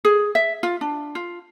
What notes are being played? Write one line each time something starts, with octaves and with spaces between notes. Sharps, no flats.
G#4
E5
F4
D4
F4